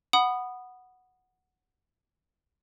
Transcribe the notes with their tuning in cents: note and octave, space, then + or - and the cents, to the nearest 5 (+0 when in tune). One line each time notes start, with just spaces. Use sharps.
F#5 +0 B5 +0 D#6 -15